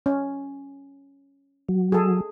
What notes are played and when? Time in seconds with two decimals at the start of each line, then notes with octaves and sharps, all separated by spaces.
0.06 C#4
1.69 F#3
1.92 G#4 A4